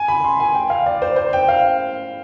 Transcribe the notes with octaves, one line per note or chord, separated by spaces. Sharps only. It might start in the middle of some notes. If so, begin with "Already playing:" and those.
Already playing: G#5
B5
C6
G#5
G5
F5
D5
C5
C5
G5
F5